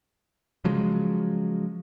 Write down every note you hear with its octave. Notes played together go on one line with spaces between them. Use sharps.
C#3 F3 F#3 G#3